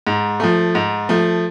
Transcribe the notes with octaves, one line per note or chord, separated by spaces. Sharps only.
G#2
F3 A3
G#2
F3 A3